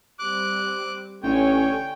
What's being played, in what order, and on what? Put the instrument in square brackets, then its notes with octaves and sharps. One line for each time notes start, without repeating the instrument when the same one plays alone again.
[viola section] G3 C4 [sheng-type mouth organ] D6 F#6
[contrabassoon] A1 [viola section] D3 C#5 G#5 [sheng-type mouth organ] G5